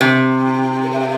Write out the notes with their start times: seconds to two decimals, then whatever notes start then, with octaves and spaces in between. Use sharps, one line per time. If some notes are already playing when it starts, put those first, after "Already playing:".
0.01 C3